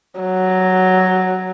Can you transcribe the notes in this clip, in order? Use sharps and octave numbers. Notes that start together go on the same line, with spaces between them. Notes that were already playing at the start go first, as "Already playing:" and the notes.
F#3